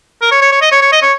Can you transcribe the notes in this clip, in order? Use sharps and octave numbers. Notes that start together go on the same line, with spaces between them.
A#4
C#5
C#5
C#5
D#5
C#5
C#5
D#5
C#5